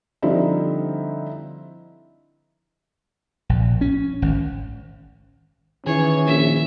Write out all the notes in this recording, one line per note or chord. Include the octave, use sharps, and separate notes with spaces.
D3 F3 G3 C4 D#4 E4
A#1
C#4
G#1
D#3 E3 C#4 G#4 C#5
A#1 E5